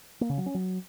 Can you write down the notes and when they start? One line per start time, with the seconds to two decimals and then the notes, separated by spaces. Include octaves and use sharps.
0.21 A#3
0.29 C#3
0.38 F#3
0.46 C#4
0.54 F#3